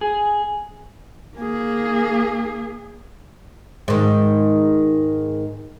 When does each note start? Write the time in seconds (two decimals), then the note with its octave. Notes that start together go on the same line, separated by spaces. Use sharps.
0.01 G#4
1.37 A#3 G#4
3.88 G#2 D#3